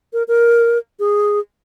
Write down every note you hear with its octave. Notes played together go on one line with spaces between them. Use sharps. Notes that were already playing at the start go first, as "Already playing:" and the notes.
A#4
A#4
G#4